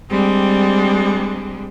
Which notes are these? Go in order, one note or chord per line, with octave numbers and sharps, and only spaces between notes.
G3 G#3 C4 D4